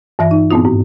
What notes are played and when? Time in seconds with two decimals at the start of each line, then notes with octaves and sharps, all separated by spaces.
0.19 G2 E3 E5 A#6
0.31 D#4
0.51 G2 A#2 B3 C4 E4 F4
0.65 G#2